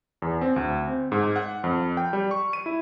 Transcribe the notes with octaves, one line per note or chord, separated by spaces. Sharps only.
E2
C4
D2
C4
G#2
F#5
F2
G5
G3
C#6
D#7
E4